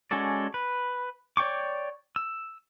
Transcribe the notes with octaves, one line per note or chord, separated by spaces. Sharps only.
G#3 C#4 F#4 A4 D5
B4
C#5 D5 G5 C#6 D6
E6